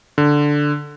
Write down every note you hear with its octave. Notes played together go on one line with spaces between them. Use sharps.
D3